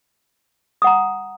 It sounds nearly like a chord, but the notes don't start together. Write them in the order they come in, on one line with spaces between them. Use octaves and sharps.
D#6 F#5 A#5